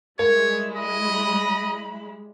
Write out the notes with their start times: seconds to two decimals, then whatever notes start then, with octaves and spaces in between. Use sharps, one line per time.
0.19 G3 G#3 E4 A#4 C#5
0.76 D#5 B5